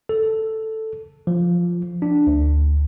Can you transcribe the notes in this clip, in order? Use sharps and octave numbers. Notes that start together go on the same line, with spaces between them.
A4
F3
D4
D2